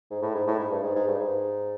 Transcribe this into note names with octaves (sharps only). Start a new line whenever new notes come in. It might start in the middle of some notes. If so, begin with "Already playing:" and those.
G#2
A2
G#2
A2
G#2
G2
G#2
G#2
G2
G#2